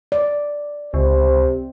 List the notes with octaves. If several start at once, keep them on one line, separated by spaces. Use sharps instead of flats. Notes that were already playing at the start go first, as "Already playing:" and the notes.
D5
C#2 C3 C5